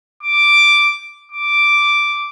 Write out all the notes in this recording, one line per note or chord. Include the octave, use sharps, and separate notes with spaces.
D6
D6